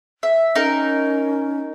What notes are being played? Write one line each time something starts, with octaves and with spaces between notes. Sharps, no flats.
E5
C#4 D#4 A#4